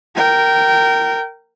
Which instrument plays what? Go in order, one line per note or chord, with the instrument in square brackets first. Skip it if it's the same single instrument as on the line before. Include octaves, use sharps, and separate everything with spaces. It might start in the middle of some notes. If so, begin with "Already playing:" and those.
[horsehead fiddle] A#4 G5